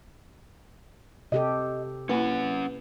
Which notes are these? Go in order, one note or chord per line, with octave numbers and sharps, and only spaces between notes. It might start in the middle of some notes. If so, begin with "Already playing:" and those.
C3 G4 A4 D#5
A#3 C#4 E4 B4 F#5